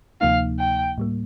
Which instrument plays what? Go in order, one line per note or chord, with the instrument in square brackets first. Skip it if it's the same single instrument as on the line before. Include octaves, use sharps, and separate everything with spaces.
[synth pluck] D2 C3 F3 A#3 D#4 [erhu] F5
[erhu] G5
[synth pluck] A2 G3 A#3